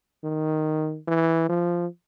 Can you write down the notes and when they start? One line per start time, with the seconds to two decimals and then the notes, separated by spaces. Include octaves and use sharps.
0.24 D#3
1.07 E3
1.49 F3